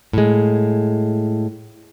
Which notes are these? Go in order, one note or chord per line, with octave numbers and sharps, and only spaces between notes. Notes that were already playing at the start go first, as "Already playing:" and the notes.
A2 G#3